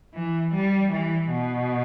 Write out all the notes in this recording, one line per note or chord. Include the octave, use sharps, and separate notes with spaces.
E3
G3
E3
B2